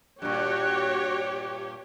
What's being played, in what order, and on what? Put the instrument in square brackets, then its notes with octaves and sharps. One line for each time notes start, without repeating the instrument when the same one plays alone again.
[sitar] G2 A#2 [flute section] F#4 F#6 [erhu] G4 [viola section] C#5